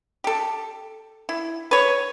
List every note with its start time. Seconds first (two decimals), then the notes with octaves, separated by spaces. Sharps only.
0.24 G4 A4
1.29 E4
1.71 B4 C#5